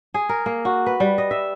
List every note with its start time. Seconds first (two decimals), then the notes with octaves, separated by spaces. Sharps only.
0.14 G#4
0.29 A#4
0.46 A#3
0.65 F#4
0.86 B4
1.00 G3
1.18 D#5
1.31 E5